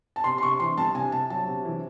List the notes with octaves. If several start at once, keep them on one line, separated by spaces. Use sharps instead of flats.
A5
C3 C6
C6
C3 C#6
E3 C6
C2 A5
C3 G#5
C3 A5
F#3 A5
C3
E3